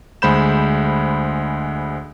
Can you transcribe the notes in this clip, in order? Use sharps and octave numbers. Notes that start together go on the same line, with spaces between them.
D2 G#3 C5 B5 G6 E7